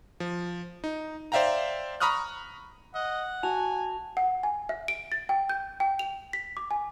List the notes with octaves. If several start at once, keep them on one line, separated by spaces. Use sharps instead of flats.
F3
D#4
C5 D5 E5 F5 G5 A#5
A#5 B5 C#6 D#6 F6 F#6
D#5 F#5
F#4 G#5 A5 F7
F#5
G#5
E5
D7
A6
G5
G6
G5
F7
B6
D6
G#5